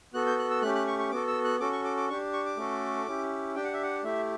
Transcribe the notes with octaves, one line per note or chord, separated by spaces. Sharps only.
B3 F#4 A4 F#6
G6
F#6
E6
A3 C#4 G4 F#6
F#6
C#6
C#6
B3 F#4 A4 D6
E6
F#6
C#4 F#4 A4 D6
C#6
D6
D6
D4 G4 C#6
C#6
D6
A3 C#4 F#4 A4
C#4 E4 G4
D4 G4 G5
F#5
E5
F#5
A3 E4 G4 E5